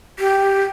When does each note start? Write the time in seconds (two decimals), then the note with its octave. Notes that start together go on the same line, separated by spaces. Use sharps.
0.19 G4